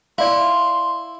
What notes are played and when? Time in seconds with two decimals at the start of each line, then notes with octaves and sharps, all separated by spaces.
0.18 E4 D5 F5 C6